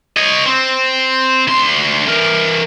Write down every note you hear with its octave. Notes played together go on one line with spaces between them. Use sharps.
C#5 D#5
C4
D2 C6
E3 A#4